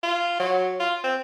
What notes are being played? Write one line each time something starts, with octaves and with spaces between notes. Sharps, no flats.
F4
F#3
F4
C4